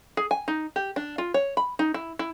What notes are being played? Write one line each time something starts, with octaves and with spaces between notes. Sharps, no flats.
G#4
G#5
D#4
G4
D4
F4
C#5
B5
D#4
E4
E4